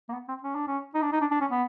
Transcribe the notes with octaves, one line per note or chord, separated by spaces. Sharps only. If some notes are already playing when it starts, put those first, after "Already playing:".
A#3
B3
C4
C#4
D4
C#4
D#4
D4
D#4
D4
D4
C#4
B3